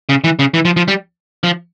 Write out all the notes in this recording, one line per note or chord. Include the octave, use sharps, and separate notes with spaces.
C#3
E3
C#3
E3
F3
F3
G3
F3